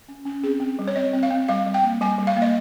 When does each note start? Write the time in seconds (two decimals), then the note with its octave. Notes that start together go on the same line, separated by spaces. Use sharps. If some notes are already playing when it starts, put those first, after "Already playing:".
0.08 C#4
0.25 C#4
0.43 C4 G#4
0.60 C4
0.79 G3
0.88 C#5
0.96 C4 D#5
1.14 C4
1.23 F5
1.31 C4
1.48 G3 F5
1.66 G3
1.74 G5
1.83 A#3
2.01 G3 G#5
2.18 G3
2.27 F5
2.37 A#3
2.42 D#5